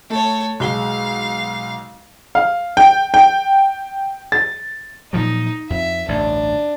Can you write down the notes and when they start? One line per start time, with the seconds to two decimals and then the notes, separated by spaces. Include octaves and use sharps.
0.10 A3 A4 C#5
0.60 B1 G#3 F5 G7
2.35 F5
2.77 G5
3.14 G5
4.32 A6
5.13 A#2 F3 F#3 D#4
5.70 F2 E5
6.08 A1 D2 G2 D4